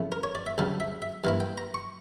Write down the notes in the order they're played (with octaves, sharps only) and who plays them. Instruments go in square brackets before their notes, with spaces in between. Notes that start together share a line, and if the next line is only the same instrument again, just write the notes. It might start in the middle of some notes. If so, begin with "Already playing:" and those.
Already playing: [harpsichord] C#3 F3 A3 C#4 E4
A#4
C#5
D5
E5
D2 C#3 G3 F5
E5
E5
G2 E3 A#3 E4 F5
G5
A#5
C#6